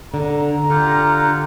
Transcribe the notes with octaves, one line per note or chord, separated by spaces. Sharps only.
D3 A#5
D3 F4 G4 F#5